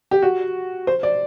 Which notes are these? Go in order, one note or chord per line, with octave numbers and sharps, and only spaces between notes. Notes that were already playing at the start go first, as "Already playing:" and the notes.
G4
F#4
C5
D5